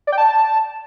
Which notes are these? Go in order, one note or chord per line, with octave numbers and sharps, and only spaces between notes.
D5
G5
A5